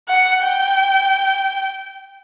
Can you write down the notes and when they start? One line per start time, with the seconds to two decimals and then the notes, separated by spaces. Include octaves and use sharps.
0.09 F#5
0.44 G5